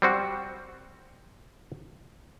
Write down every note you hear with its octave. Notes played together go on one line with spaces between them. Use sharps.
G3 C4 F#4